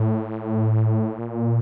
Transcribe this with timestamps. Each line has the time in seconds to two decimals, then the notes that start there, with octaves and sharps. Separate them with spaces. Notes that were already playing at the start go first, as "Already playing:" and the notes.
Already playing: A2
1.19 A#2